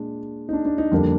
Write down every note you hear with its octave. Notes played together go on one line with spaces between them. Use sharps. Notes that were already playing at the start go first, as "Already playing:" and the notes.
Already playing: A#2 G#3 D4
D#4
D4
D4
D#4
F2 D3 G3 A#3 D4